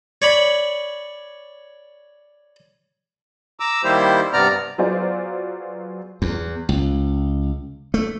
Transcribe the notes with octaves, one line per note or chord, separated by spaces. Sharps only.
C#5 D5 B5
A#5 D6 E6
D#3 G3 A#3 E4 G4 C5
G2 C3 B3 D5 A#5 F6
F#3 B3 F4 G#4 C5 D5
E2
C#2
A3